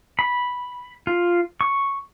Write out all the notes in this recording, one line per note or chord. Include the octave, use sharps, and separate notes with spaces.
B5
F4
C#6